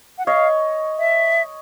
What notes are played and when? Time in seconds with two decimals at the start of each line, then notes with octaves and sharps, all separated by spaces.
0.18 F#5
0.26 C#5 D#5 F5
0.99 E5